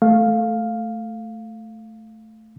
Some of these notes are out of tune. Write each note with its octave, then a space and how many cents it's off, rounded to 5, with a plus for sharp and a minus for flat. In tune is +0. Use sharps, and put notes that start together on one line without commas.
A3 +0 F5 +5